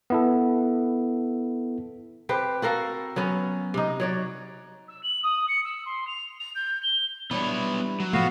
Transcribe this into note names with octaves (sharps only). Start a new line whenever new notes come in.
B3 E4 A4
C4 G4 B4
F#4 A4 A#4 F5
F#3 B3 C#4
C3 D#4
F#3 C#5 D5
E6
F#7
D#6
C#7
E6
C6
F7
F7
G6
G7
E3 G3 B3 D4 C#5
F#3
A2 C3 F3 A3 B3 F#4 F5